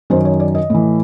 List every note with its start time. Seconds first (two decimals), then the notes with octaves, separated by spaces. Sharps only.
0.10 F#2 D#3 C5
0.25 C#5
0.40 D5
0.55 D#5
0.70 A2 E3